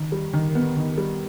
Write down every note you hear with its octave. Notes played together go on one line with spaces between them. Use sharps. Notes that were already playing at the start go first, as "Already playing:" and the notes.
Already playing: D#3
G3
D#3
B3
D#3
G3